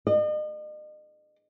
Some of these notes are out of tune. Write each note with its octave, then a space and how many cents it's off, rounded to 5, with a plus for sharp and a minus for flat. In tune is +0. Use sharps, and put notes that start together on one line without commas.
D#5 -40